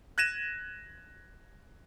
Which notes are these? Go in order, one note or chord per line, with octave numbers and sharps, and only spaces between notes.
F#6 G#6 A#6 D#7 E7